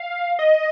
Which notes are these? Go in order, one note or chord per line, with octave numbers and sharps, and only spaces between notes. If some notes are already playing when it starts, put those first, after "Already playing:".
Already playing: F5
D#5